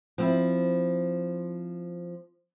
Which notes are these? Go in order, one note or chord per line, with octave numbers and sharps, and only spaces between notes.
F3 C4 E4